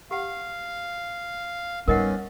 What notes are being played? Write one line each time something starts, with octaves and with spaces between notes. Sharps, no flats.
G4 F5 F#5
G#2 G3 B3 C#4 A#4 D#5 F#5